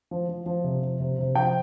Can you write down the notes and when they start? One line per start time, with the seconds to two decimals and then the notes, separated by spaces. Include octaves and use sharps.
0.11 F3
0.29 F3
0.46 F3
0.64 C3
0.83 F3
1.00 C3
1.19 C3
1.35 F3 G5